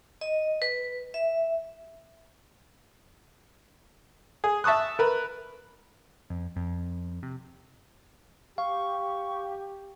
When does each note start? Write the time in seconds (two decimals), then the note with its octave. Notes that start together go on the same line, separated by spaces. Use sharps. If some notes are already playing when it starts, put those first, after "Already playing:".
0.21 D#5
0.62 B4
1.14 E5
4.44 G#4
4.64 E5 A5 C#6 D#6 F#6
4.99 A#4 B4
6.30 F2
6.56 F2
7.23 C3
8.58 G4 F5 C#6